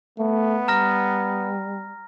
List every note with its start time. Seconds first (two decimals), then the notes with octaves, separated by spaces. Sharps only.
0.18 A3 B3
0.68 G3 A#5 F6 A#6